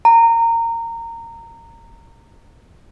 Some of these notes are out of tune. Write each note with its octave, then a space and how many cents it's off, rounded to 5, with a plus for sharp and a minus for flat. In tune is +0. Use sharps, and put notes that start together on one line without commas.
A#5 -20